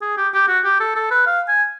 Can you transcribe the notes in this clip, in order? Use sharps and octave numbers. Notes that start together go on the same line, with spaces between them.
G#4
G4
G4
F#4
G4
A4
A4
B4
F5
G#5